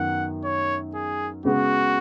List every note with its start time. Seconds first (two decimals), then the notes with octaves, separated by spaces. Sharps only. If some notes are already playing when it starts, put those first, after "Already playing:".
Already playing: F#2 D#3 B3 F#5
0.44 C#5
0.95 G#4
1.45 C#3 G#3 B3 F#4